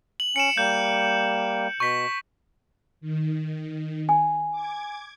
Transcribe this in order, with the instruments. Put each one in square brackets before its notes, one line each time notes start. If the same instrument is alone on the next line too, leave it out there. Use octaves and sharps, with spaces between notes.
[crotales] F#7
[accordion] C#4 [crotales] C#7 D7 E7
[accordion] G3 A#3 [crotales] G6
[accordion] B2 [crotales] C#6 B6
[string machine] D#3
[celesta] G#5
[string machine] D6 G#6